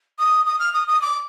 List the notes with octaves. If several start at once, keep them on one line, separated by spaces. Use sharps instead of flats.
D#6
D#6
F6
D#6
D#6
D6